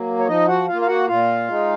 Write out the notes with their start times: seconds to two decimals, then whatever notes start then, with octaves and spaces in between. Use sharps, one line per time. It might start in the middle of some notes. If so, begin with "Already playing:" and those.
Already playing: F#3 A#3
0.18 C#5
0.27 F3 D#4 D#5
0.48 F#4 F#5
0.67 F4 F5
0.73 A#3
0.82 F5
0.87 F#4 F#5
1.07 A#2 F4 F5
1.48 G#3 D#4